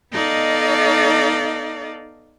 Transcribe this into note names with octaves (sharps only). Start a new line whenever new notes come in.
B3 D#4 A4 D5 D#5 F5